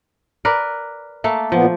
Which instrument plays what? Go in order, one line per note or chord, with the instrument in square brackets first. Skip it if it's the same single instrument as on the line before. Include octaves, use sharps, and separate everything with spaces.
[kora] A#4 B4 D5
A3 A#3 A4
[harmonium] A#2 B3 [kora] F3